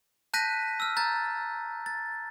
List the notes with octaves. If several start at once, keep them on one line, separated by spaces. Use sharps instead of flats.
A5 F#6 G6 A#6 B6 D#7
E6 F6
A#5 G6 A6
A6